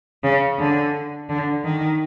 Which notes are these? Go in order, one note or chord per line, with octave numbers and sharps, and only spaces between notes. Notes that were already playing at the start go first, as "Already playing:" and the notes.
C#3
D3
D3
D#3